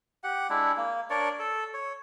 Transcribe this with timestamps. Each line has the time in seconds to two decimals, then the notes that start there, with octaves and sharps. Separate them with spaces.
0.24 G4 F#5
0.50 G#3 D4 E4
0.77 A#3
1.10 D4 A#4 C#5 D5
1.39 A4
1.74 C#5